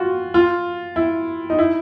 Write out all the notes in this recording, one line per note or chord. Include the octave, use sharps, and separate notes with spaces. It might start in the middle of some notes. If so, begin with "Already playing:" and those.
Already playing: F4 F#4
F4
E4
D#4
E4